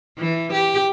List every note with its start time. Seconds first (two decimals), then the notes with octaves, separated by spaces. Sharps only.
0.18 E3
0.53 G4